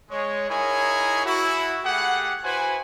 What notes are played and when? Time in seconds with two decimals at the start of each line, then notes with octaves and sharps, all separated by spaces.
0.11 G#3 C#5
0.49 D#4 E4 G#4 A#4 C#5 G#5
1.26 E4 F#4
1.85 A3 G4 G#4 F#5
2.44 E4 F#4 B4 C5 G#5